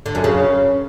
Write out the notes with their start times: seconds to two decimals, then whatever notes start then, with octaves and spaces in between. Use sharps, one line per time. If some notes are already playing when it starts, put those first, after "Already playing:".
0.06 D3
0.15 F#2
0.24 C#3